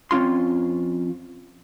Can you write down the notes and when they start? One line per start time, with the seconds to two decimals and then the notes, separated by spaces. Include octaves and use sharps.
0.11 F2 C4 C#4 F4 C6